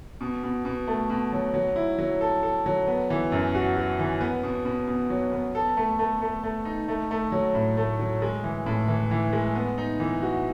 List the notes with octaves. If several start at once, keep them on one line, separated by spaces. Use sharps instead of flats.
B2
B2
B2
A3
B2
F#3
F#3
E4
F#3
A4
A4
F#3
B3
E3
F#2
F#4
F#4
E3
B3
B2
B2
B2
F#3
B3
A4
A3
A3
A3
A3
D#4
A3
A3
F#3
A2
A3
F#3
G#3
E3
A2
E3
E3
G#3
B3
D#4
E3
F#4